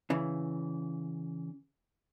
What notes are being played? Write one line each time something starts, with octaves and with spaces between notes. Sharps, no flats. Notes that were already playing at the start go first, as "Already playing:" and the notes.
C#3 E3